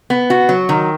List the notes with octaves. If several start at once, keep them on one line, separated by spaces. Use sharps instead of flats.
B3
F#4
F#3
D#3